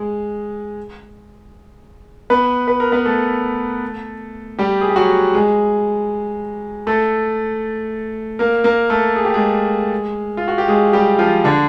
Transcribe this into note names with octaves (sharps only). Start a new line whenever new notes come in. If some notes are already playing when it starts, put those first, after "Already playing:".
Already playing: G#3 G#4
B3 B4
B4
A#4
B3 B4
A3 A4
G3 G4
G#4
G4
F#3 F#4
G#3 G#4
A3 A4
A#3 A#4
A#3 A#4
A3 A4
G#4
G4
G#3 G#4
F4
F#4
G4
G#3 G#4
G3 G4
F3 F4
D3 D4